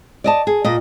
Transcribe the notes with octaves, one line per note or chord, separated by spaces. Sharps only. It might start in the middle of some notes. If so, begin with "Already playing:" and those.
D5 D#5 A5
G#4
A#2 D#5